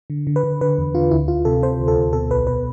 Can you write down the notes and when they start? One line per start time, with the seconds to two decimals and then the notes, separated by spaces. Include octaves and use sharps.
0.10 D3
0.27 D3
0.36 B4
0.43 D3
0.61 D3 B4
0.78 E2
0.95 D3 F4
1.11 D2 E4
1.28 D2 F4
1.45 C3 A4
1.62 C3 C5
1.80 D2
1.88 A4
1.97 D2
2.13 B2 A4
2.31 B1 B4
2.47 B2 B4